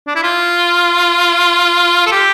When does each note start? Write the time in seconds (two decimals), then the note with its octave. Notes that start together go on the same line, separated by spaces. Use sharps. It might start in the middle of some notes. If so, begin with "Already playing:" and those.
0.07 D4
0.15 E4
0.23 F4
2.06 A4
2.12 G4